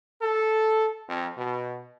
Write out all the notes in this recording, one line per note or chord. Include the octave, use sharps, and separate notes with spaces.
A4
F2
B2